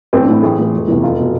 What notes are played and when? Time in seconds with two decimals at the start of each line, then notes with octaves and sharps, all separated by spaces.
0.13 A1 C4
0.23 D4
0.28 A2 E3 E4
0.43 A1 G#4
0.59 A2 E3
0.73 F1
0.87 E2 C3 E3
1.03 F1 F4
1.20 B2